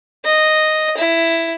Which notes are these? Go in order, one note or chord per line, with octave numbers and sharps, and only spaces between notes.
D#5
E4